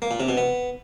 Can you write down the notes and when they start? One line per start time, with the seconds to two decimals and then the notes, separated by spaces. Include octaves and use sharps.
0.02 A#3
0.11 A#2
0.20 C3
0.29 B2
0.37 B3